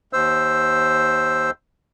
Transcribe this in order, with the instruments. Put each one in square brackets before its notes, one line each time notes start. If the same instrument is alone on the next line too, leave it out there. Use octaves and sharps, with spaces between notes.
[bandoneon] D#2 C5 E6